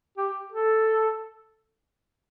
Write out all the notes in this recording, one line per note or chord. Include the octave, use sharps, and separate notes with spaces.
G4
A4